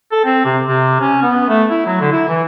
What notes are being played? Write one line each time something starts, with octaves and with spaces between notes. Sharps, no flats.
A4
C4
C3
C3
C#4
B3
A3
E4
F#3
D3
E4
E3